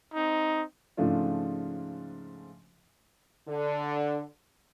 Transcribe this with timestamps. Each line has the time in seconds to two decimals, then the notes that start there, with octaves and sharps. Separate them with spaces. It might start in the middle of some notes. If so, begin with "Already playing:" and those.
0.15 C4 D#4
0.97 G#2 C#3 F3 A3 D4 F4
3.48 D3